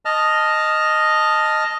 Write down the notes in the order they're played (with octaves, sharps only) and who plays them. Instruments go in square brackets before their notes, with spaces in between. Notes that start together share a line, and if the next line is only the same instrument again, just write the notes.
[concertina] D#5 A5 F6